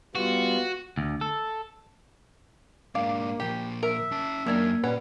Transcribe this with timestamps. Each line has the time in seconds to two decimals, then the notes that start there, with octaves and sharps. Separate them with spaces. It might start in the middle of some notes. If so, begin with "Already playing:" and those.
0.15 G3 B3 F4 F#4
0.97 D2
1.21 A4
2.95 G#2 A#3 D4 F5 D6
3.40 A#2 F3 G4
3.83 A#4 E5
4.11 C#4 A5
4.46 F#2 D#3 A#3 D4 A#4 E6 G#6
4.84 A#2 G3 C#4 B4 F#5